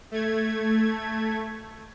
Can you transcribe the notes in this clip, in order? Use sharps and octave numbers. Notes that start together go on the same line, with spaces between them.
A3 G#6